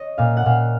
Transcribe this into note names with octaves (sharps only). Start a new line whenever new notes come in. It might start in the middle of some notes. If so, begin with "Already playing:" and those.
Already playing: C#5 D#5
A#2 F5
F#5
A#2 F5